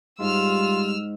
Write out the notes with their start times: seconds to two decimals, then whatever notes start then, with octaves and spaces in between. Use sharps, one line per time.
0.20 G#2 G3 F4 E6 F6